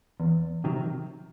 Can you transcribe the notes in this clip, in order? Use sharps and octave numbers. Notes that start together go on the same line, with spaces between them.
E2
C3 D#3 F#3